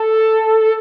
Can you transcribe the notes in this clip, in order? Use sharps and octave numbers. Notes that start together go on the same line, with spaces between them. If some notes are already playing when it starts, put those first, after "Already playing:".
Already playing: A4